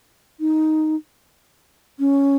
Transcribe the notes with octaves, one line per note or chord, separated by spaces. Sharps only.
D#4
C#4